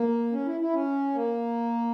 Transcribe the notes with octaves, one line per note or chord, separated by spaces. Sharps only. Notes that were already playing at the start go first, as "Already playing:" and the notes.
Already playing: A#3
C#4
E4
E4
C#4
A#3